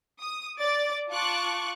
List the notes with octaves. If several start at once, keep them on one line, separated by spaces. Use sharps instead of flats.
D#6
D5 D6 A6
F4 A5 C#6 D6 F#6